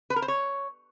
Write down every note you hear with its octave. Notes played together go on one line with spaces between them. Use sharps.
B4
A#4
C5
C#5